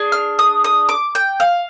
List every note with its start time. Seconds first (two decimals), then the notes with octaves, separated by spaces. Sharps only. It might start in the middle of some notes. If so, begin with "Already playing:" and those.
Already playing: D4 G#4
0.12 F6
0.39 D#6
0.64 D#6
0.89 D6
1.15 G5
1.40 F5